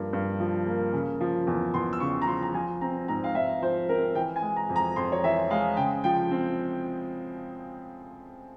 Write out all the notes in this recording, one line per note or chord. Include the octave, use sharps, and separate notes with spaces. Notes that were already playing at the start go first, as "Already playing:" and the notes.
Already playing: G2 F3 A#3
G2
F3
A#3
C#3
F3
E2
E2 C6
E6
C#3 C#6
A#5
F3 C6
A#5
F3 G#5
C4 A#5
G#2 A#5
F5
G#2 E5
F3 C5
C4 A#4
E3 G5
G#5
G#3
A#5
F2
A#5
F2 C6
C#5
E3 E5
G#3 F5
C#3 G5
F3 G5
C4